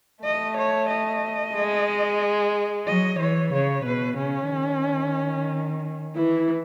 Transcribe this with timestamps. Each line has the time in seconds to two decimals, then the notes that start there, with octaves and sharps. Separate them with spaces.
0.24 A3 D#5
0.58 C#5
0.90 D#5
1.56 G#3
2.87 F#3 D#5
3.19 E3 C#5
3.53 C#3 C#5
3.85 B2 B4
4.18 C#3 C#4
4.51 D#3
6.15 E3 E4